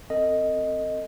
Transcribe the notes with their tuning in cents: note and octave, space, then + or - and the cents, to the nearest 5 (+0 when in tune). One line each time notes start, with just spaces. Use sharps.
C4 +5 A4 +40 D#5 +0